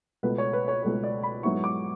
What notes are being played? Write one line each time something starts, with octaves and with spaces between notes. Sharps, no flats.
C#2 B2 A3 B4
C#5
B4
C#5
C#2 B2 A3 C#5
D5
B5
G#2 F#3 B3 E4 C#6
D6